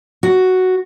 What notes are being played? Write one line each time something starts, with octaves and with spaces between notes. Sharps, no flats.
F#4